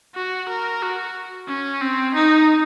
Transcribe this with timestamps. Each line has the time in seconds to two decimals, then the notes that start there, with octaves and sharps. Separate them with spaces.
0.15 F#4
0.49 A#4
0.83 F#4
1.48 C#4
1.81 C4
2.15 D#4